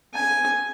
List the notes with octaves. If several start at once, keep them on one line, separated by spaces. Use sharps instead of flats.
G#5